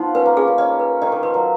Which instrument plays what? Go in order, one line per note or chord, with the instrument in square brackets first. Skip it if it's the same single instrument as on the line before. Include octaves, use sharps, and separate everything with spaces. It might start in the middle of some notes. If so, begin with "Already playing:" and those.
Already playing: [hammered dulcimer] F3 B3 [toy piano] D#4
[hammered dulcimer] C#4 [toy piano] B4
[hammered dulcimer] A#3
[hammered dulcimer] C#4 [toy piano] G#4
[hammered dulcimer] C#4
[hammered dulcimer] C#4 [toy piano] D#5
[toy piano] B4
[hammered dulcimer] D#3 [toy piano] D#5
[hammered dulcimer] D#3
[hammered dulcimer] F3 [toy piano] B4
[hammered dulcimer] F#3